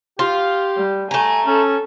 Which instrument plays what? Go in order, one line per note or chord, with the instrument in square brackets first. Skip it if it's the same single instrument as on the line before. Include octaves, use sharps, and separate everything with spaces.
[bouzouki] F4 [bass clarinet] G4
[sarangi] G3
[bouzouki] A3 A#5 [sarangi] G#5
[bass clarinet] C#4 [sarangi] A4